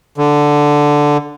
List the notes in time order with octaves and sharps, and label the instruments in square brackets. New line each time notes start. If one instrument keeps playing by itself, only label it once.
[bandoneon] D3